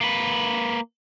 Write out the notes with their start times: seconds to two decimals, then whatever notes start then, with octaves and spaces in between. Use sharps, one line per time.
0.01 A#3 B4